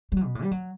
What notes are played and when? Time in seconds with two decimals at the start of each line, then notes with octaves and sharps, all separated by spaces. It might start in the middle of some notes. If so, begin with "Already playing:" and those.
0.12 G3
0.17 F#3
0.25 B2
0.35 A2
0.43 G3
0.51 F#3